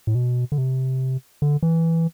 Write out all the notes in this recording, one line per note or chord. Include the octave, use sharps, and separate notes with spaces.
A2
B2
D3
C3
D3
E3